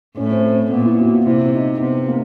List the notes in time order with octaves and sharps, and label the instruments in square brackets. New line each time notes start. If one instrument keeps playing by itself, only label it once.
[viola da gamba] A2 [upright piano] C#4
[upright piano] C4
C4
C4
[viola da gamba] A#2 [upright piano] B3
[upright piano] E4
F#4
F4
[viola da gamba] C3 [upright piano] E4
[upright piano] D#4
[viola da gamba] C3 [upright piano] B3
[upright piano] A#3